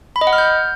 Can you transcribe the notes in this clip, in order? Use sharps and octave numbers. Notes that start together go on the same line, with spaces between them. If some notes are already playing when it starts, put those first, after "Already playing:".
B5
D#5
F#5
F6
G6